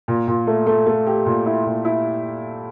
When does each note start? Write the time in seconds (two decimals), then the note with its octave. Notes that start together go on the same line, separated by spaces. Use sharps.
0.08 A#2
0.28 A#2
0.47 A3
0.67 A3
0.87 A3
1.07 G4
1.26 A#2
1.46 E4
1.65 A#2
1.85 E4